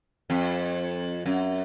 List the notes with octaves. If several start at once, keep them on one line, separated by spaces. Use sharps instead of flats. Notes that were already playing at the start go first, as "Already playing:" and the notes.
F2
F#2